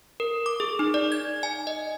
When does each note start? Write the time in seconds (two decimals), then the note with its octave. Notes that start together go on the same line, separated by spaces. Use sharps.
0.20 A#4
0.46 D6
0.60 G#4
0.79 D#4
0.94 D5
1.12 G#6
1.43 G#5
1.67 D#5